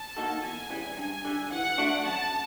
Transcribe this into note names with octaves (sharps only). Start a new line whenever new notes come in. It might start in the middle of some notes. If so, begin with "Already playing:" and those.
Already playing: A5
A#3 D#4 F#4 A4
E2 G#5
C#3 E3 G3
G2
D3 G3
E3 F#5
A3 D4 F#4
F#2 A5